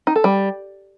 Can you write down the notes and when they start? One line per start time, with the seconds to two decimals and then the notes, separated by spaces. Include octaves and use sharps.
0.07 D#4
0.16 A4
0.24 G3